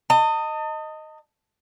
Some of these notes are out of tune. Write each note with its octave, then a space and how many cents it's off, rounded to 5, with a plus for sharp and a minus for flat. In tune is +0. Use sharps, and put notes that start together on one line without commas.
D#5 +0 A5 +40